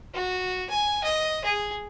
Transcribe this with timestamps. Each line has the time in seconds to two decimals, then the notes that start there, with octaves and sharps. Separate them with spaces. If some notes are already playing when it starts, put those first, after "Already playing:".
0.14 F#4
0.70 G#5
1.03 D#5
1.44 G#4